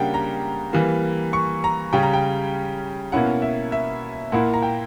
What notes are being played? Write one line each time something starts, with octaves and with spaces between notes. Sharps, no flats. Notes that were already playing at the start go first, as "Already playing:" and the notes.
Already playing: C#3 G3 A#3 D4 F#5 G5
A#5
E3 G3 A#3
C#6
A#5
C#3 G3 C#4 G5
A#5
G5
B2 A#3 C#4 E4 F#5
E5
E5
A#2 A#3 E4 F#5
A#5
G5